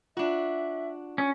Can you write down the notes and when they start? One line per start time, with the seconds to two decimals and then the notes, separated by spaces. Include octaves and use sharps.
0.17 D4 F4 F#4 E5
1.18 C#4